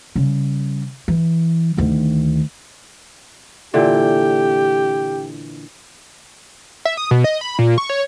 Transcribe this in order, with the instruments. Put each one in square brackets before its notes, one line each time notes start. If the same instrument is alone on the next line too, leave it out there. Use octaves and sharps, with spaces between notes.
[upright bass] C#3 G3
E3
D2 D#3
[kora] A#2 D3 E3 [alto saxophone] G4
[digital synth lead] E5
D#6
B2
D#5
B5
A#2
C#6
C#5